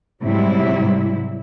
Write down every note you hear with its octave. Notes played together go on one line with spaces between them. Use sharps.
G#2 C3 F#3 G3 E4